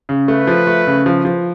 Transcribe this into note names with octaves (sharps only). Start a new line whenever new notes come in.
C#3
A3 B4
F3
A3
C#3
F3
F3